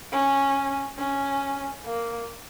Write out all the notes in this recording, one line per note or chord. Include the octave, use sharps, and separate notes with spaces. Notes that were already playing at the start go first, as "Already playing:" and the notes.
C#4
C#4
A#3